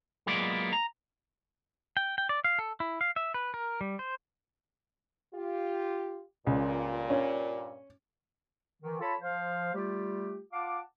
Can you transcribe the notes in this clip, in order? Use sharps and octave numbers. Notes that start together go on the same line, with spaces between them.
F#3 G#3 A#3 B3 F4 D5
A#5
G5
G5
D5
F5
A4
E4
F5
E5
B4
A#4
G3
C5
F4 G4
C#2 G2 A#2
C#4
D#3 E3
F4 A4 C#5 A5 B5
F3 C5 F5
G3 A3 F4 G4
F4 F5 F#5 A5 D6